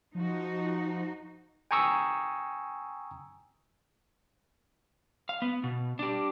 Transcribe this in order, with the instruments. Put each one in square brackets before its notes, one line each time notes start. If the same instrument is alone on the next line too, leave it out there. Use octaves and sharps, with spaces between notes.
[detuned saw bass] F3 [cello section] D#4 F#4
[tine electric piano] G5 G#5 A#5 C#6 D#6 E6
[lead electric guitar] F5
B3
B2
D4 G4